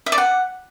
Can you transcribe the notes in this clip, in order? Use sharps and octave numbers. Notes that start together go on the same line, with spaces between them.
E5
D5
F#5